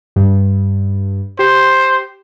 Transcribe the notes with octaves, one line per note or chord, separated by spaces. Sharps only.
G2
G4 C5